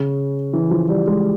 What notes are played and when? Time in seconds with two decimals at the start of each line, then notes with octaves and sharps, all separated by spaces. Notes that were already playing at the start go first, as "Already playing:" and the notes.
Already playing: C#3
0.53 E3
0.71 F3
0.89 G3
1.07 G#3